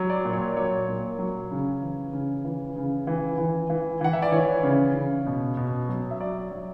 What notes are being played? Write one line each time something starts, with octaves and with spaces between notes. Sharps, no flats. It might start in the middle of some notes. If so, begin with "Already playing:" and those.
Already playing: F#3
D5
A#2
C#5
D5
F#3 C#5
A#2
F#3
C#3
E3
C#3
E3
C#3
E3
E3
E3
E3 F#5
E5
D5
E3 C#5
C#3
C#3
B2
B2
F#3
E5
F#3 D5
F#3